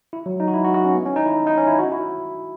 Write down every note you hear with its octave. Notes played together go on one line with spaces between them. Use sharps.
E4
F#3
D#4
F#4
E4
F#4
F#4
C#4
B3
C#4
D#4
E4
D#4
C#4
E4
F#4
E4